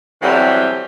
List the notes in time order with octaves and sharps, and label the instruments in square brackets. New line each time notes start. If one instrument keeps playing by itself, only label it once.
[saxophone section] B2 E3 F#3 G3 A3 C4